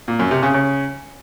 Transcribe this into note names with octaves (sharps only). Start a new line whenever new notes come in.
A#2
F#2
C3
C#3
C#3